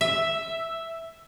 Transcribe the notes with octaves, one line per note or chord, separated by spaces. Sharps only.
E5